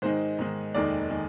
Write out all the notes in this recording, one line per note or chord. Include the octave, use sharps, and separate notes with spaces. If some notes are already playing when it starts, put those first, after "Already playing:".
G#2 D#3 G#3 D#4 C5
G#2 D#3 G#3 D#4
F1 D#2 D#3 G#3 D#4 D5
D#3 G#3 D#4